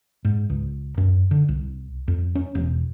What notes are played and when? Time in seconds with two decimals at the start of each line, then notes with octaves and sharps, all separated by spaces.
0.25 G#2
0.50 C#2
0.98 F#2
1.31 D3
1.49 C2
2.08 F2
2.35 C#4
2.55 E1